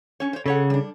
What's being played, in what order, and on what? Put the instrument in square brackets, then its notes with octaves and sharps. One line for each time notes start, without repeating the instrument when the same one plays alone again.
[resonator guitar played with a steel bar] C#4 C#5
C5 C#5
[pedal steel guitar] C#3 [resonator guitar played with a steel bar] A4 C#5 F#5
[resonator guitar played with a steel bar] G3 D4